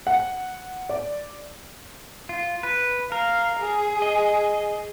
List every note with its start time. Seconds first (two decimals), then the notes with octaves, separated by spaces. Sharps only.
0.07 F#5
0.89 D5
2.29 F4
2.63 B4
3.12 A#4 F5
3.60 G#4
4.02 D#5